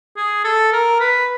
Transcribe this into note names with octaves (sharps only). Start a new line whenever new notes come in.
G#4
A4
A#4
B4